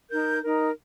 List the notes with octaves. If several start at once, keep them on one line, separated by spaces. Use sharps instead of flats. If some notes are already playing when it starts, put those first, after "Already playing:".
D#4 A#4 G6
D#4 A#4